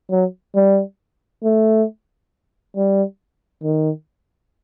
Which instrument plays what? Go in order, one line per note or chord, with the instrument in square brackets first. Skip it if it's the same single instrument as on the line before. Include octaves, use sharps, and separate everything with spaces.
[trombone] F#3
G3
A3
G3
D#3